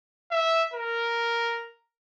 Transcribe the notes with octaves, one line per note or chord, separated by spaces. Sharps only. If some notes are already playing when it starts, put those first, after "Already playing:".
E5
A#4